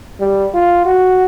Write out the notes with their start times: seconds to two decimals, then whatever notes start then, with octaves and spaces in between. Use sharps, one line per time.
0.20 G3
0.54 F4
0.85 F#4